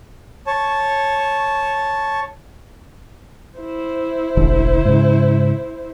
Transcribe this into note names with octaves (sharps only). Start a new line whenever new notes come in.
C#5 A5
E4 C5
E1 A1 D3
G#2 C#3